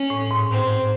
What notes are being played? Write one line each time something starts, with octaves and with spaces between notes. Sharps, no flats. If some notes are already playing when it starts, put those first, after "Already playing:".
Already playing: C#4
A2
G#2
C4